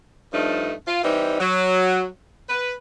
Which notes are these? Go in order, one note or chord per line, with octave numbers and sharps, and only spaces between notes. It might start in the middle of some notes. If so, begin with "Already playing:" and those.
G2 F3 A3 D4 D#4
F4
E3 G3 C4 D#4
F#3
B4